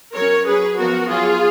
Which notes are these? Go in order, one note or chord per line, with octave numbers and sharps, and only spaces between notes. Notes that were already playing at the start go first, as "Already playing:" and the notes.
F#3 C#4 A#4 C#5
F#3 C#4 G#4 B4
F3 B3 F#4 A#4
F#3 B3 F4 G#4